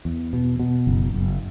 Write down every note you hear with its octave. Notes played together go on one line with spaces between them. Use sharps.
E2
B2
B2
F#1
F#1